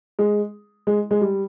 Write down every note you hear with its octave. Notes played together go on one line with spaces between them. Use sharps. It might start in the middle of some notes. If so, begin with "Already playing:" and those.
G#3
G#3
G#3
G3